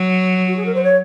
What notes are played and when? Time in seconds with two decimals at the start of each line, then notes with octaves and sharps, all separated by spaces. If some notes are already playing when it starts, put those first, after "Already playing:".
Already playing: F#3
0.47 F#4
0.56 G#4
0.65 A#4
0.74 C5
0.83 C#5